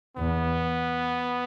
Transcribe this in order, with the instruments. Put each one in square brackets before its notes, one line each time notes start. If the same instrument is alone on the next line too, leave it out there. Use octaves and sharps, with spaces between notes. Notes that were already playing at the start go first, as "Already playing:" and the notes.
[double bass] E2 [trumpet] B3